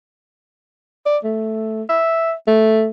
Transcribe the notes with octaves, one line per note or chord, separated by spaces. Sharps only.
D5
A3
E5
A3